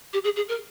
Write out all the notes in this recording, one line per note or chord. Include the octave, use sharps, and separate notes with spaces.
G4
G#4
G#4
A#4